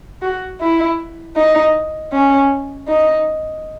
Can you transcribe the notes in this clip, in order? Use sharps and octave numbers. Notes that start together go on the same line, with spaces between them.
F#4
E4
D#4
C#4
D#4